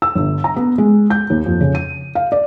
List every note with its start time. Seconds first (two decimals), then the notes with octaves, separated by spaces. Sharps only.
0.02 E6
0.15 G1
0.44 A#5
0.56 B3
0.78 G#3
1.10 G6
1.30 D#2
1.46 F2
1.61 C#3
1.75 D#7
2.15 F5
2.32 D5